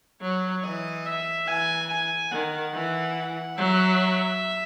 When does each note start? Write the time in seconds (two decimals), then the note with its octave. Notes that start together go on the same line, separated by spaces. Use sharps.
0.21 F#3 C#5
0.63 E3 D#5
1.06 E5
1.47 E3 G#5
1.90 G#5
2.32 D#3 F#5
2.74 E3
3.58 F#3 E5